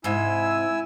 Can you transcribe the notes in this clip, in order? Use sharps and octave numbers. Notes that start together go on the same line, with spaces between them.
G#2 C3 E4 G#5 E6